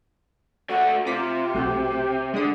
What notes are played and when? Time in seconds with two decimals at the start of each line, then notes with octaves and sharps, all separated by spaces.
0.70 A3 F#4 F#5
1.06 C3 F4 A#5 D6 B6
1.55 B1 A3 F#4 G4
2.34 D3 G#3 D#6